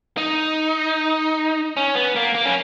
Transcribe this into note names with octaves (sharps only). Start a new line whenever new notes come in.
D#4
C#4
B3
A#3
A#3
C#4